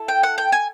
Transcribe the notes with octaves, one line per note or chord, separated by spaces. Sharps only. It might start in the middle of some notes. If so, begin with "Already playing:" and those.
Already playing: E4 A4
G5
F#5
G5
G#5